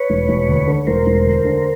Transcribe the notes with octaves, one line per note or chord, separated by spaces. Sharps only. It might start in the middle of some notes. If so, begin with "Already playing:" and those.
Already playing: B4 C#5
E1
E1
D2
D3
E1 A#4 C5
E1
D2
D3